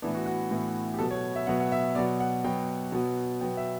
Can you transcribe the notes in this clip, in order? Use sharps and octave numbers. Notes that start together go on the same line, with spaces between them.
A2 E3 B3 D4
F#4
F#4
A2 E3 B3
G4
B2 F#3 B3 A4
C#5
E5
B2 F#3 B3 F#5
F#5
E5
B2 F#3 B3 D5
F#5
B2 F#3 B3 G5
B2 F#3 B3
B2 F#3 B3 G5
E5